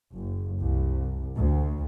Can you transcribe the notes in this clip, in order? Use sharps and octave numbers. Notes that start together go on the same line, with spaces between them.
F#1
C2
D2